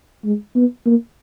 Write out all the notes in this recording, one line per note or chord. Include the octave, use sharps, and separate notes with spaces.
G#3
B3
A#3